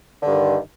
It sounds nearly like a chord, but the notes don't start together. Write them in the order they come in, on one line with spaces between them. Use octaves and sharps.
D3 G2 D#3